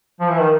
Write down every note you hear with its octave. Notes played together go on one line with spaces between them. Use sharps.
F3
E3
D#3